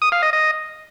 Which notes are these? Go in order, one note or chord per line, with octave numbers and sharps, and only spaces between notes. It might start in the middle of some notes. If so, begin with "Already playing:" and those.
D#6
F5
D#5
D#5